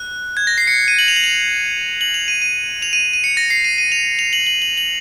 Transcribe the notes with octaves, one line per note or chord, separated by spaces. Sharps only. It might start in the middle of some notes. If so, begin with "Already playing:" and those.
Already playing: F#6
G#6
A#6
C7
C#7
C#7
D#7
F#7
F7
F#7
F7
F#7
F7
D#7
D#7
F7
D#7
D#7
C#7
A#6
C7
D#7
D#7
F7
F7
F#7
F#7
F#7
F#7